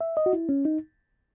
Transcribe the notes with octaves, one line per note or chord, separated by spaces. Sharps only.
E5
D#5
F#4
E4
C#4
D#4